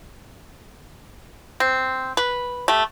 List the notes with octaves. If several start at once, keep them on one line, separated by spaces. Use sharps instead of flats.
C4
B4
A3 G4